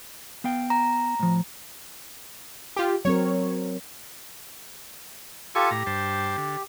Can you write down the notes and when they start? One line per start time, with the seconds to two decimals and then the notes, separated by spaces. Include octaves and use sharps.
0.44 B3 F5 G5
0.70 A#5
1.19 A2 F3
2.76 F4 G4
3.05 F#3 C4 A#4 C#5
5.55 F4 G4 A4 G#5 C#6
5.71 A2 G4 A#5
5.86 G2 C5 A5
6.38 D3